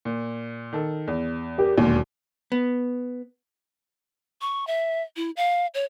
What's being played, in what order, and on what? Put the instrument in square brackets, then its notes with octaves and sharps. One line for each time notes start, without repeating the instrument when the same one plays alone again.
[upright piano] A#2
D#3 A4
E2
[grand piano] G4 A#4
[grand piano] E1 [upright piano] D#2 A#2
[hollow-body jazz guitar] B3
[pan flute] C#6
E5
E4
F5
C#5